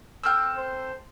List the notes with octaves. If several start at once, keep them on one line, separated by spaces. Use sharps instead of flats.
C4 A4 G5 E6 F6
C5